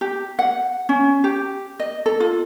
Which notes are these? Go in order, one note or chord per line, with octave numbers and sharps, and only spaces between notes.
G4
F#5
C#4
G4
D#5
A4
F4